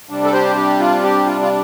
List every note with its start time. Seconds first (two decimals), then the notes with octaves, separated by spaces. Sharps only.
0.09 C3 G3 D4
0.24 A4
0.33 G4 C5
0.56 G4
0.79 F4
1.03 G4
1.26 F4
1.42 F4